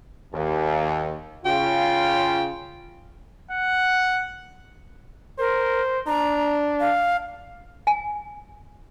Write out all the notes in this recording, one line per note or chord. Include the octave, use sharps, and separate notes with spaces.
D#2
C#3 F4 G5
F#5
A#4 C5
D4 A#5
F5
G#5